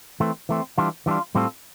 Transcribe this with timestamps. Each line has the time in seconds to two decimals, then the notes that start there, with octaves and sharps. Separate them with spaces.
0.20 E3 A3 C4
0.49 E3 A3 C4
0.78 E3 G3 D4 F4
1.06 E3 G3 D4 F4
1.35 A2 G3 C4 F4 A4